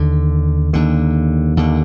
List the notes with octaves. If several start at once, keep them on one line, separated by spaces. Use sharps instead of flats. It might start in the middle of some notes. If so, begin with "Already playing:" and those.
Already playing: D#2 D3
D#2 D3
D#2 D3